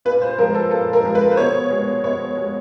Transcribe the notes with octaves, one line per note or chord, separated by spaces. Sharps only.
A#2 B4
C5
F3 G#3 A#4
A4
A#2 A4
A#4
F3 G#3
B4
C5
B2 C#5
G#3
B2 C#5
G#3